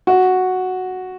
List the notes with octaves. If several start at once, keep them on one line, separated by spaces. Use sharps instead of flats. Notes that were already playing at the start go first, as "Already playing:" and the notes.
F#4